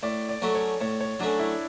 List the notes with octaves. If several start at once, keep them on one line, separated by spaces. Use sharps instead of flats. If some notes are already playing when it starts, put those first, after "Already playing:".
A2 D5
D5
F#3 A3 C#4
C#5
A2 C#5
C#5
F#3 A3 C#4 D4
E4